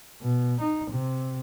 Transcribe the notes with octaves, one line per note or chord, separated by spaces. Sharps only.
B2
D#4
C3